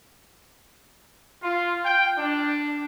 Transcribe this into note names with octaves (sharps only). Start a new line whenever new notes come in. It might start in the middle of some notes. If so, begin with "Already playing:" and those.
F4
G5
D4